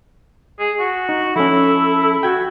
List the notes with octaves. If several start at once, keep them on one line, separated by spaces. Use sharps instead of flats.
G#4
F#4
D#4
F3 C#4 E4 A4
F#4 G5 G#6